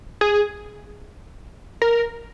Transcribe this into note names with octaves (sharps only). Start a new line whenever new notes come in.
G#4
A#4